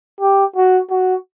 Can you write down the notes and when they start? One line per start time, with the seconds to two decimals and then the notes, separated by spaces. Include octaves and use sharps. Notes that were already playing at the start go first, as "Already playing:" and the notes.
0.20 G4
0.56 F#4
0.90 F#4